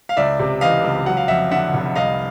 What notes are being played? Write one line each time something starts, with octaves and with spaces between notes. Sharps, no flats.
F5
C#2 D5 E5
C3
E3 D#5 F5
C#2
F#3 F#5
F5
F2 E5 F#5
D3 E5 F#5
F1
C2 D#5 F5